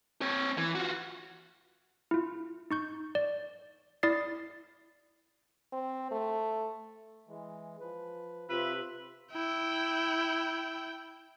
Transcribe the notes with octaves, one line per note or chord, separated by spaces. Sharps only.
C4 C#5
E3
F4 F#4
E4 F4
D#4 C#6 G6
D5
E4 D5 D#6 A6 C7
C4
A3
E3 G#3
F3 B4
C3 F4 B4 E5
E4 G5